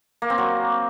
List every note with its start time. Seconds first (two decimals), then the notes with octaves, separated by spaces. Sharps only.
0.22 A#3
0.30 C4
0.38 F#3